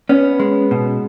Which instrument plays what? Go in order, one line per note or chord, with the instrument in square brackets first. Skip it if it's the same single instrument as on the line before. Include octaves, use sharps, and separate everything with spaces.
[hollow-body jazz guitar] B3 C#4
G#3
B2